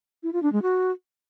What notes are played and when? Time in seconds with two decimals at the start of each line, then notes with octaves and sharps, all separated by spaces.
0.23 E4
0.33 F4
0.43 D4
0.52 G#3
0.62 F#4